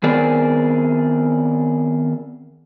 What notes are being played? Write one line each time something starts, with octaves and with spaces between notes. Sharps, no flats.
D#3 B3 C4 G#4 A#4 D5